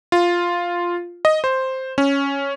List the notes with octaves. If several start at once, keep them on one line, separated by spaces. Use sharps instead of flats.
F4
D#5
C5
C#4